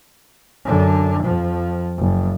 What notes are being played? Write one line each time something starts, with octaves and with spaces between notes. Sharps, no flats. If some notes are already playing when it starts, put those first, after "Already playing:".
F#2 D3
F2 F3
F#1